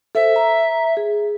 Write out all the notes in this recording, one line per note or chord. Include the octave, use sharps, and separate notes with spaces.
A4 C5 E5
A#5
G#4